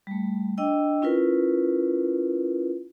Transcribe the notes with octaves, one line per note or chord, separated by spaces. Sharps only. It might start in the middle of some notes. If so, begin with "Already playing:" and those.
G3 A3
D4 D#5 G5 E6
C#4 E4 F4 A#4 B4